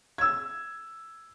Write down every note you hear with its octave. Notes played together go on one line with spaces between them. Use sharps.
E6 G#6